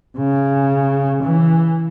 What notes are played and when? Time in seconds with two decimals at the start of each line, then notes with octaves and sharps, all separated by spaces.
0.17 C#3
1.23 E3